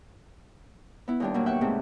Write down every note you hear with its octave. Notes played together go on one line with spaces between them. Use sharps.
B3 E4
D#2 G3 D4
B2 F#3 A#3
E5 F#5 G5 C#6
G#2 C3 A3 C4